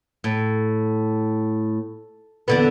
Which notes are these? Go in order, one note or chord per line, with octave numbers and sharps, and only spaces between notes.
A2
E2 D3 B3